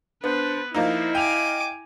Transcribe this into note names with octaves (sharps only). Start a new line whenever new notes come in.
B3 D4 B4 C5
F3 A#3 D#4 E4 D#5 F5
G5 G#5 D6 F7